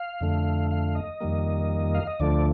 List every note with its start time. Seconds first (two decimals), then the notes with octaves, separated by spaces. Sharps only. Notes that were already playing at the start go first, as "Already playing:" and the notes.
Already playing: F5
0.21 F2 D3 A3
0.71 F5
0.95 D#5
1.21 F2 D#3 G3 A#3
1.95 F5
2.07 D#5
2.20 D2 D3 F3 A3 D5